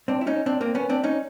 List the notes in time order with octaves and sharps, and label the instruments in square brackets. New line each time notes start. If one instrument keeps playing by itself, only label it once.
[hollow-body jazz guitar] C4 D4
E4
C#4 D#4
C4 D4
A#3 C4
B3 C#4
C4 D4
C#4 D#4